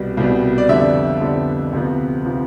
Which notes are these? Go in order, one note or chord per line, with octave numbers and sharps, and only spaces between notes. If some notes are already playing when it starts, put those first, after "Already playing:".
Already playing: C2 B2 G3 B3
C2 B2 G3 B3
D5
F2 D3 G3 B3 E5
F2 D3 G3 B3
D2 C3 F3 B3
C3 F3 B3